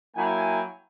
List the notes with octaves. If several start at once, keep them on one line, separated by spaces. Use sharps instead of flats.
F#3 A#3 E4 G5 G#5